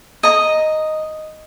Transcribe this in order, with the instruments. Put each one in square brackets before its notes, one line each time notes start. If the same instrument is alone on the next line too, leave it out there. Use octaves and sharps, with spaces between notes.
[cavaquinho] D#5 A#5